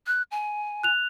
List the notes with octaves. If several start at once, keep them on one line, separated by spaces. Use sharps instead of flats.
F#6
G#5
F#6 F7